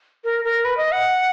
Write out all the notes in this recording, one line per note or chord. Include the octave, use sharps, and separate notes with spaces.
A#4
A#4
B4
D#5
F#5